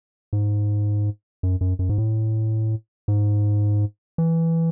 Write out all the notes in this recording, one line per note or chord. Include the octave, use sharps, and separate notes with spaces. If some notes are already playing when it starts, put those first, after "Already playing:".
G#2
F#2
F#2
F#2
G#2
A2
G#2
E3